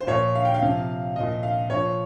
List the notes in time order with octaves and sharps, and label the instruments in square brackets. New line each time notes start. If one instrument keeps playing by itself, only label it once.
[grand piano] C5
A#2 F3 C#5
F5
G5
F5
C3 F3
A#2 F3 D#5
F5
A#2 F3 C#5